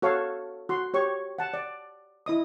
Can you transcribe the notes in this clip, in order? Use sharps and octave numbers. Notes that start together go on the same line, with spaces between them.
F#4 A4 C#5 F5 C#6
F#4 C6
G4 C#5 C#6
F#5 A5
D5
E4 D#5 D#6